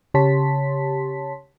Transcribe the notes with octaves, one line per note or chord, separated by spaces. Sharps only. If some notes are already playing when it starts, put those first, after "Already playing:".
C#3 G4 C#5 A5 C6 B6